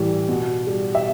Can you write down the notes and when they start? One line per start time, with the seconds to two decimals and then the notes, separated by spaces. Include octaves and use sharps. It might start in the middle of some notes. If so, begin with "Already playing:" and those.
Already playing: A2 E3 G3
0.28 B2
0.67 G3
0.95 E5